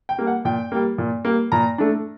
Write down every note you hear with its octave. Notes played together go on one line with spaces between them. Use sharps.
G5
G3 A#3
F#5
A#2 G5
G3 A#3
A#2
G3 A#3
A#2 A#5
A3 D4